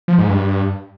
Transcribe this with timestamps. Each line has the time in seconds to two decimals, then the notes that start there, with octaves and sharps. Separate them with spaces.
0.08 F3
0.19 G#2
0.29 G2